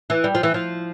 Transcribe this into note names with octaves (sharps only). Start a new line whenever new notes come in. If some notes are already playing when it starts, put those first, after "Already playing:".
E3
G3
F3
E3
F3